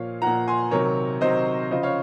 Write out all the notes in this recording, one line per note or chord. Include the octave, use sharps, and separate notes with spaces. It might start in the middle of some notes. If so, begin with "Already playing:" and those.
Already playing: A#2 F3 C#5 F5
A#2 F3 F#5 A#5
G#5 C6
C3 D#3 F#3 A#4 C#5
C3 D#3 F#3 C5 D#5
C#3 F3 C5 D#5
C#5 F5